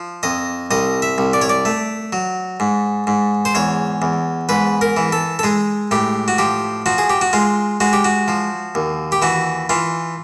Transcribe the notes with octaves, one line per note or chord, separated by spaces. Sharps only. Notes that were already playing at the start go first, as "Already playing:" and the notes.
Already playing: F3
F2 D#5
C2 D#5
E5
C2
D5
C#5
D5
A3
F#3
G#2
G#2
C5
E2 C#5
E2
G#2 B4
A#4
E3
A4
A4
G#3 G#4
A2 G4
F#4
F3 G4
F3 F#4
G#4
G4
F#4
G#3 F4
G#3 F#4
G4
F#4
F3
D#2
G4
E3 F#4
E3 F4